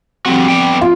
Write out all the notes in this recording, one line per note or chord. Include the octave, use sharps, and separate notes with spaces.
D3 F3 G3 C4 F#4
B3 D5 G5
F4